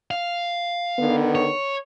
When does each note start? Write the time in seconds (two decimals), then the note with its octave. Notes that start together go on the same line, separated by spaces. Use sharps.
0.11 F5
0.99 D3 D#3 B3
1.35 C#5